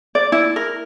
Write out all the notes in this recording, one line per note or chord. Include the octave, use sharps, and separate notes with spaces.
D5
E4
A#4